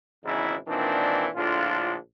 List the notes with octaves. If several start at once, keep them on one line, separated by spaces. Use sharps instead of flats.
G#1 E2 C#3 E3 D#4 E4
A#2 D#3 E3 C4 D4
A#1 A2 D3 D4 F4